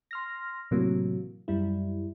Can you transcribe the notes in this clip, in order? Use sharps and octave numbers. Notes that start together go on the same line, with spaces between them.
C6 F6 A#6
A2 C3 E3 F#3 A#3
F#2 G3 E4